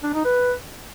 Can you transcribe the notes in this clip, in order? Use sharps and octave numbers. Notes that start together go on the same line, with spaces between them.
D4
D#4
B4